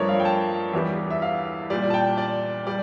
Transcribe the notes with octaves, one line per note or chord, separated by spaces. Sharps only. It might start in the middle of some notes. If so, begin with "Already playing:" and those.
Already playing: G2 F3 A3 A#4 C#5 D5
F5
G5
A5
E2 E3 G3
E5
F5
A#2 G3 D5
A5
G5
D5
G3 D5